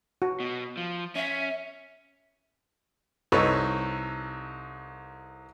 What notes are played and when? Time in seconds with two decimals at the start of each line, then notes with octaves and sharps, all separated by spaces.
0.22 F#4
0.40 B2
0.77 F3
1.16 C#4 E5
3.32 C2 D#4 A4 B4 C#5 C#6